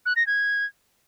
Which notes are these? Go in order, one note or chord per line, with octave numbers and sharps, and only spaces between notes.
F#6
A#6
G#6